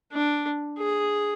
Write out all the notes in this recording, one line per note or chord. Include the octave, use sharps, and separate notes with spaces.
D4
G#4